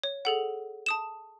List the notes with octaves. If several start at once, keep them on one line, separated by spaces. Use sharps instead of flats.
C#5
G#4 A4 F#5
A5 D#6 E7